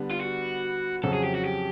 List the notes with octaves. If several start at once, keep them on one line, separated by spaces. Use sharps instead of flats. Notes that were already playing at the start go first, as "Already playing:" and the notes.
Already playing: D3 G3 B3 D4
F4
F#4
F2 C#3 F#3 A4
G#4
G4
F#4
G4